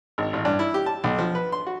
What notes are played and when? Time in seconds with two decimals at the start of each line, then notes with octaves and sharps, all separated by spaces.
0.18 G#1
0.33 A1
0.45 G2
0.59 E4
0.74 G4
0.86 A5
1.04 B1
1.19 F3
1.35 B4
1.52 C6
1.67 F#4